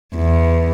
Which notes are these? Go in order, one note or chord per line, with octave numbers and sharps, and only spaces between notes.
E2